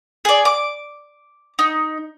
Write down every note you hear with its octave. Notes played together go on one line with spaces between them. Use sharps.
G#4 D5
D6
D#4